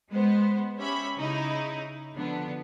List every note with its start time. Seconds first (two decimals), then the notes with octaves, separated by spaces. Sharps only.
0.11 G#3 B3 C5
0.78 C#4 G4 C#5 E5 B5
1.16 C#3 D#4 E4
2.15 D3 F3 B3 D4